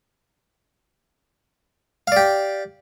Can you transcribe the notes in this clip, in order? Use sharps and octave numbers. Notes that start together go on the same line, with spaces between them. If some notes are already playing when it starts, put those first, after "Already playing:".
G4 D5 F5